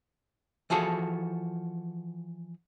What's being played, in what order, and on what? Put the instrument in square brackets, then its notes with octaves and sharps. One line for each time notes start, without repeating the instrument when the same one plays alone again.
[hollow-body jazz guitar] E3 F3 F#4 G#4 A4